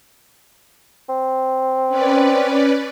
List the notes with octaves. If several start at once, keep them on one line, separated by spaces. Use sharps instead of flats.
C4
C#4 B4 D5